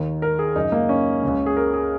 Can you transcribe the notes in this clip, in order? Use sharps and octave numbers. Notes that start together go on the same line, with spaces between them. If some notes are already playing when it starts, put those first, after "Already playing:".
Already playing: D#2 D#3
A#4
G#4
F#2 C#3 D#4
A#3
C#4
C#2 C#3
G#4
A#4
G#4